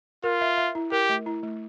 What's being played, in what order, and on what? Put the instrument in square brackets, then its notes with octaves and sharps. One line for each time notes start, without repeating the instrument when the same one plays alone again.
[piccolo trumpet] F4 [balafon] A#4
[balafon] E5
E5
E4
[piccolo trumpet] G4 [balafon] A#4
[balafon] A3
E4
A3